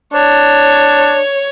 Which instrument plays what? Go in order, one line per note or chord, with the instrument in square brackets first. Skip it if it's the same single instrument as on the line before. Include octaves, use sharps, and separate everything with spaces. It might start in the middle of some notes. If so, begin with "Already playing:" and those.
[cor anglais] D4 [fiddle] C#5